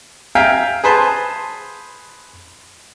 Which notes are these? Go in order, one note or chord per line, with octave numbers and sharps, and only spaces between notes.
E5 F5 G5 G#5 A#5
G#4 B4 C5 A5